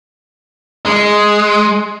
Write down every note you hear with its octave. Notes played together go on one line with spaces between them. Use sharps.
G#3